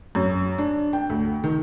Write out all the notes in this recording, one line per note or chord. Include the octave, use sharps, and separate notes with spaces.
F#2
D4
G5
D2
D#3